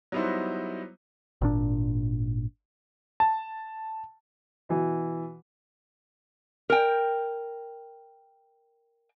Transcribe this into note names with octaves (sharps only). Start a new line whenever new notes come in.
F#3 G3 B3 D#4 E4 C5
G#1 A#2 D4
A5
B2 E3
A#4 G5